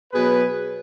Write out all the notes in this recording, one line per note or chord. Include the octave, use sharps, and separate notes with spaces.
B2 F#3 G#4 B4